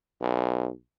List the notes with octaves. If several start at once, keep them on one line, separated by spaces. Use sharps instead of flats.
B1